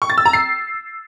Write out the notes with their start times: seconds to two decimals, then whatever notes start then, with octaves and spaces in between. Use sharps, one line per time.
0.02 C#6
0.10 A6
0.18 E6
0.25 A#5
0.33 C7